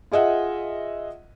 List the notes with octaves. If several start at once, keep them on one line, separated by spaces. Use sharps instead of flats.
F4 G#4 D#5 E5 F#5